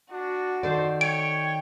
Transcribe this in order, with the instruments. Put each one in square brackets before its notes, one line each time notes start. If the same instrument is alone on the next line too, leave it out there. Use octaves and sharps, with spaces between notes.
[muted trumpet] D4 [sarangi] F#4
[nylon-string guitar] D#3 A4 D5 [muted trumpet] C5
[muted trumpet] C#5 [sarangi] G5 [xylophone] D7